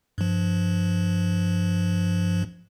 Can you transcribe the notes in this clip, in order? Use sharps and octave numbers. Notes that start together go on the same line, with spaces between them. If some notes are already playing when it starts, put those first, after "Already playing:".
G2 F3